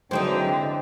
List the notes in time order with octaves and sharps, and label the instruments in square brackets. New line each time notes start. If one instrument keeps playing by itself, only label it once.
[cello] D3 [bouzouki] E3 C4 D#4 [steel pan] F#3 G#3 C5 [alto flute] G5